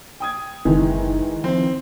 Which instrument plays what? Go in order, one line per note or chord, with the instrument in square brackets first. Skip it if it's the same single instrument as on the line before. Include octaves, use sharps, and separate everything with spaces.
[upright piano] G5 D#6 G#6
[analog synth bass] F#1 [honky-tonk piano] D#3 E3 [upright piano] G#3
[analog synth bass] F3 [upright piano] C4